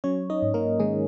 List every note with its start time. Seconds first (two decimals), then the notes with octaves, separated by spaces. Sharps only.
0.04 F#3 C#4 C#5
0.30 D#4 D#5
0.42 G#2
0.54 A#3 A#4
0.80 D#3 G#3 G#4